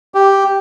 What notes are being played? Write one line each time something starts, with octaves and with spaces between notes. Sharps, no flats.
G4